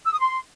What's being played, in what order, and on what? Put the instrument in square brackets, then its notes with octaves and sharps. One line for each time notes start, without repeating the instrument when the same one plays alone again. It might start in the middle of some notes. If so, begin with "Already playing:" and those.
[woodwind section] E6
D#6
C6